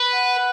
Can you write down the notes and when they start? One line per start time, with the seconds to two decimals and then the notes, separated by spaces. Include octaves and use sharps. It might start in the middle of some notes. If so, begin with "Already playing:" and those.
Already playing: B4
0.14 F#5